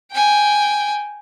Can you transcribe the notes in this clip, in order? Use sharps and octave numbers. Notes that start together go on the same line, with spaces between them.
G5 G#5